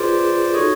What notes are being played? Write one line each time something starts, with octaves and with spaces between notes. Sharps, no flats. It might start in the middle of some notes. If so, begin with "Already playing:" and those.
Already playing: F4 G#4 B4 C5 D5
D#4 F#4 A4 C#5 D#5